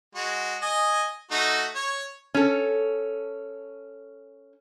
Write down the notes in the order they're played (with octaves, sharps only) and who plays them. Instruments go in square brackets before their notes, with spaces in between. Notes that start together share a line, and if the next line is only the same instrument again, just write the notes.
[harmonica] G#3 F#4
D#5 G#5
A3 D#4 F#4
C#5
[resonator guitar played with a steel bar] C#4 A4